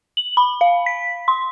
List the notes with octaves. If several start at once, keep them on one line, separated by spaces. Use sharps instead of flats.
F#7
B5
F5
B6
C6